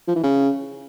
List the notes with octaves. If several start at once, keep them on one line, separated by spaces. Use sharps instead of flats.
F3
E3
C#3